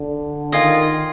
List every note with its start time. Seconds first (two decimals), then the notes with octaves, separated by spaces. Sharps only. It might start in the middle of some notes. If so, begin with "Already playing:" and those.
Already playing: D3
0.52 D#3 F4 G#4 D#5 G#5